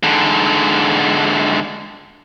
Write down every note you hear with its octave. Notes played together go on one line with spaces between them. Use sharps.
G#2 D3